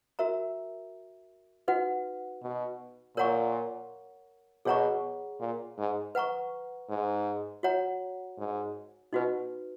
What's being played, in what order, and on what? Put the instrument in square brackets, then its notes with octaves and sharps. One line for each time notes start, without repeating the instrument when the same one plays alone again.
[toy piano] F#4 A#4 E5 A#5
D#4 F#4 B4 F#5
[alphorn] B2
[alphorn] A#2 [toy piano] A#4 C#5 F#5 A#5 C#6
[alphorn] B2 [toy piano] G#4 C#5 F#5 A#5 C#6
[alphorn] A#2
G#2
[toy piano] B4 F#5 A#5 C#6
[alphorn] G#2
[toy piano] F#4 C#5 F#5 A#5
[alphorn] G#2
[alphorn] B2 [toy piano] D#4 F#4 B4